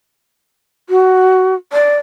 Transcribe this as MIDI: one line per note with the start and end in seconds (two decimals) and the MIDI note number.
0.89 1.55 66
1.73 1.97 74